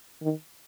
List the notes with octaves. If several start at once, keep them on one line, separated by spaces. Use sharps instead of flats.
D#3